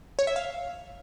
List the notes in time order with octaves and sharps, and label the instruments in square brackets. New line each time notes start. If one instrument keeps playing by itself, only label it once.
[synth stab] C#5
E5
F5